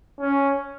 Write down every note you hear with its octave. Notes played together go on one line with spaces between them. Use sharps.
C#4